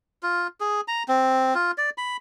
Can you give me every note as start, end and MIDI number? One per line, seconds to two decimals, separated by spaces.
0.23 0.47 65
0.61 0.81 68
0.88 1.03 82
1.08 1.54 60
1.55 1.71 65
1.78 1.90 74
1.98 2.17 83